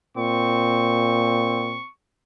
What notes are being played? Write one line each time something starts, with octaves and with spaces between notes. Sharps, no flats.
A#2 C4 C#6